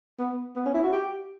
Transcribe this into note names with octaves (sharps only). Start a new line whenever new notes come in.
B3
B3
C#4
E4
F#4
G4